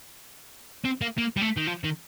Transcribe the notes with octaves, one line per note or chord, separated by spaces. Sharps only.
C4
A#3
A#3
G3
A3
D#3
F3
D#3